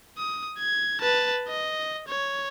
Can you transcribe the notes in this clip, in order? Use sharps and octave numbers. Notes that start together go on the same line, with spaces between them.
D#6
G#6
B4 A5
D#5
C#5